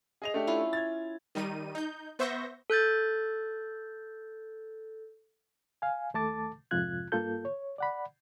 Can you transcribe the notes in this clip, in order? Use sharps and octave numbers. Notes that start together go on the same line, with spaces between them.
G#4 D#5 F7
A3 D4 G4
C#4 E4 F4
G#6 A6
D#3 G3 D#4 D#7
D#4 G6
B3 C5 E5 C#6 G6 A#6
A4 F#6 G6 A6
F5 G#5
D#2 A3 A4 A5 D6 A6
F2 G#2 C3 F4 F#6 G#6
G2 A#3 F4 A4 G6
C#5
D5 F#5 B5